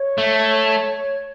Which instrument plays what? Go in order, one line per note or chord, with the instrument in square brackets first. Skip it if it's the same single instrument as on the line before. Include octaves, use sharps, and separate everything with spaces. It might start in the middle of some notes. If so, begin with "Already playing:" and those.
Already playing: [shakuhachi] C#5
[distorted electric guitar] A3